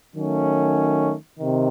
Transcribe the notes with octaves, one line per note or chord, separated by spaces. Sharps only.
D#3 F#3 A3 C#4
C3 D#3